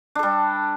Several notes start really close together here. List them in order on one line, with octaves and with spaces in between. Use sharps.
D4 A4 G3